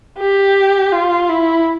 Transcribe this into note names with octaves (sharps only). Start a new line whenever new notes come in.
G4
F4
E4